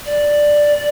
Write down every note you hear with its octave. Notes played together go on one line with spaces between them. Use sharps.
D5